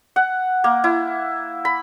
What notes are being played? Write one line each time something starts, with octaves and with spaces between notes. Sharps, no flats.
F#5
A#3
E4
B5